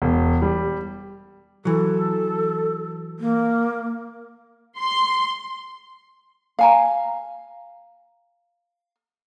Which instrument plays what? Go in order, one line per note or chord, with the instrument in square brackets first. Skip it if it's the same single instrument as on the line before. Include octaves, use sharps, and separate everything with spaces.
[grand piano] E1
G3
[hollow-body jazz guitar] E3 F#3 [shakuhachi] A4
[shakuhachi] A#3
[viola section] C6
[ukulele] F5 G#5 A#5